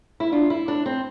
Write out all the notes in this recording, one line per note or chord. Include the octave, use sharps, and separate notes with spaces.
E4
D4 F4
E4
D4
C4